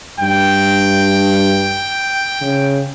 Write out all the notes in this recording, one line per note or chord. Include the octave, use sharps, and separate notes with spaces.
G2 G5
C#3